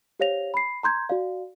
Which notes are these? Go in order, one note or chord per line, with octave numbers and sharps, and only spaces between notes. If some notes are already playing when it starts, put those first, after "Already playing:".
G4 C5 C#5 F5 A#6 F7
B5 C7
A#5 C6 G6 G#6
F#4 D5 F5